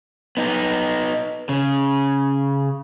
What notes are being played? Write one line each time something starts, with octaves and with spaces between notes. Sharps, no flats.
B3 D#4
C#3